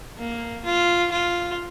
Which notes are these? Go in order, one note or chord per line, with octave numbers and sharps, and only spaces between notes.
A#3
F4
F4